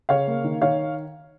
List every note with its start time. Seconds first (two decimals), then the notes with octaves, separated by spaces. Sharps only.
0.09 C#3 C#5 F5
0.27 A#3
0.44 D#3
0.62 D#3 C#5 F5